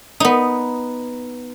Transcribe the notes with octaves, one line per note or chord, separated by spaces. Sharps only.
B3 D#4